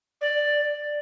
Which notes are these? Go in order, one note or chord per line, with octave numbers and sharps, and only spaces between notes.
D5